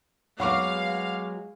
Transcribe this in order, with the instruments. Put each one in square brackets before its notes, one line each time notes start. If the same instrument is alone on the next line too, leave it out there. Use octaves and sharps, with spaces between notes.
[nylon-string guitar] F#3 B3 [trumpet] G#3 [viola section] F5 [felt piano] F#5 C#6 D6